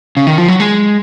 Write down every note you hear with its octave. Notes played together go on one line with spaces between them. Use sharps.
C#3
D#3
F3
F#3
G#3